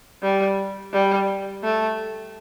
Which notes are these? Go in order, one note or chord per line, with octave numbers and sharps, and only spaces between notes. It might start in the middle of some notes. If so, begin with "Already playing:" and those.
G3
G3
A3